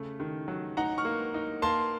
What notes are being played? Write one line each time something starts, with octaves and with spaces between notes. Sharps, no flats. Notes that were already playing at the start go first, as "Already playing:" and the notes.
Already playing: C#3 A3
D#3
F#3
D#4 F#5 A#5
C#6 F6
A#3
D#4
A#3 A5 C6